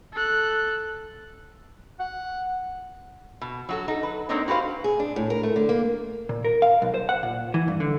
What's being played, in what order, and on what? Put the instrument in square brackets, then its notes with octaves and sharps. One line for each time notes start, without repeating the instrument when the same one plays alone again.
[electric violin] A4 F#6
[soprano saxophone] F#5
[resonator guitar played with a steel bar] B2
F#3 F#4 A4
D#4 A4
B4
A#3 C4 D4 D#4 C#5 D#5
F#4 G4 B4 C5 F5
[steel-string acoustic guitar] G#4
D4
A2
A#4
A3
D3
A#3
[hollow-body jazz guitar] A#2
A#4
F5
B1
C5
F#5
A#2
E3
G2
D3